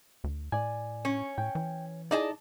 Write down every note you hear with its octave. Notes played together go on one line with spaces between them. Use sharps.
D2
A2 D5 G#5
C#4
A2 G5
E3
D#4 E4 G#4 D5 D#5 A5